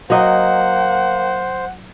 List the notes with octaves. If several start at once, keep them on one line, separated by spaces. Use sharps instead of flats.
F#3 A#3 C5 D#5 F#5